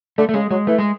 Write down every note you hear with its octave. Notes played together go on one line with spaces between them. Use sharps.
D3 A3
A3
C#3 G#3
F#3 G#3
E3 A3
G#3